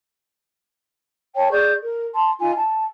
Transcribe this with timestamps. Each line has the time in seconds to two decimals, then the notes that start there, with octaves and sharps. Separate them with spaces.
1.35 C#5 G5 A5
1.51 G#4 D5 C#6 G6
1.83 A#4
2.15 A5 C6
2.39 D#4 F4 G#5
2.57 A5